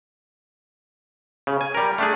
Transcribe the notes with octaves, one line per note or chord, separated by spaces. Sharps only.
C#3
G#5
G3 A#4
A3 D4 G#4